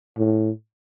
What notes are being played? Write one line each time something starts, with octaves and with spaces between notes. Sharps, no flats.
A2